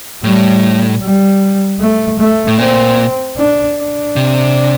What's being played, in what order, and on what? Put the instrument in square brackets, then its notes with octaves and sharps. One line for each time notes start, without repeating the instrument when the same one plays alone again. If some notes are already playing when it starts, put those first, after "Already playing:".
[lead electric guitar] A2 [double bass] G3
[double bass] G3
A3
A3
[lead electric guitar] A2
[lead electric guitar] A#2 [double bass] C4
[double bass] D4
D4
[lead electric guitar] C3